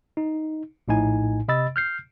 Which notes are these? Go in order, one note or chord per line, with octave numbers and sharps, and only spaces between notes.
D#4
A#1 A2 D#4 G#5
C3 D#5 B5 E6 A6
F6 G6 C7